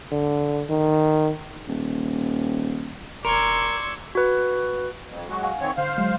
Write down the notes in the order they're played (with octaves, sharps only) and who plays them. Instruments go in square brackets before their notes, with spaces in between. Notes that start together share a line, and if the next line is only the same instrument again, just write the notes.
[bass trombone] D3
D#3
[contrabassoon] D#1
[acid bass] E1 [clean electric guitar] A#4 [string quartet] D5 E6 G#6 [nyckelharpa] C6 C#6
[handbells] F#4 B4
[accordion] F2
F#3 G#3 F#4
[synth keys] F5 F#5 G#5
[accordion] D#3 C4 C#5
[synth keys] D3 [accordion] C5 F5
[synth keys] F#3 G#3